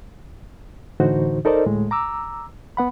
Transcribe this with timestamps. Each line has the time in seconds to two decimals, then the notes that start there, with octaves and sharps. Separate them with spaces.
1.00 A2 D3 E3 D#4 F#4 C5
1.45 D#4 A4 A#4 C5 D5 D#5
1.66 D2 A2 G#3
1.91 A#5 D6 E6
2.77 B3 F#5 B5